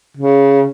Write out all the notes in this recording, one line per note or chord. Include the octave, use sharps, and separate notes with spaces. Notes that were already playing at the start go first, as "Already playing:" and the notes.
C#3